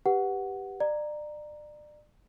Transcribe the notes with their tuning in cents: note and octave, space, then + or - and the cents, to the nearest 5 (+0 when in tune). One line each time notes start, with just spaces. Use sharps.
G4 +0 B4 +0 F#5 +0
D5 +30 A#5 +0